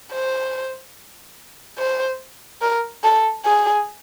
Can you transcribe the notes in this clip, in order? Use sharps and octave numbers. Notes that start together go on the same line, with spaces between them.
C5
C5
A#4
A4
G#4